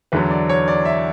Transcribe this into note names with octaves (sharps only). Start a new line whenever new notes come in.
E2 D3 F#3 B4
D5
C#5
D5
E5